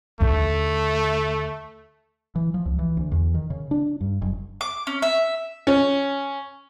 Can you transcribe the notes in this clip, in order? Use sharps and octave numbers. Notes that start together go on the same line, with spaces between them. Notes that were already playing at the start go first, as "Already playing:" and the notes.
D#2 D3 A3
E3
F3
C#2
E3
D2
E2
D#3
C#3
D4
G2
F#1
D6
C#4
E5
C#4